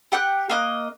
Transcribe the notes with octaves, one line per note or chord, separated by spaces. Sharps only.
G4 F#5 G5 F#6
A#3 D#5 F#6